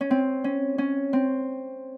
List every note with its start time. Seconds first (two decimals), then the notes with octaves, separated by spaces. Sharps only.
0.01 C#4
0.11 C4
0.44 C#4
0.78 C#4
1.13 C4